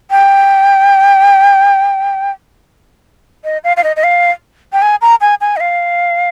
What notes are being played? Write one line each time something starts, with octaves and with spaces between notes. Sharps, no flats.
G5
D#5
F5
F5
D#5
D#5
F5
G5
G#5
A#5
G#5
G#5
D#5
F5